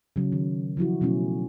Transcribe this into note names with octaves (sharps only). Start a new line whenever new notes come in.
C#3 F#3
D#3
F3 F#3 E4 F#4
B2 F#3 A3 C#4 E4